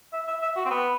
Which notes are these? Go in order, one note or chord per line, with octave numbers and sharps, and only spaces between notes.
E5
E5
E5
F#4
C4
B3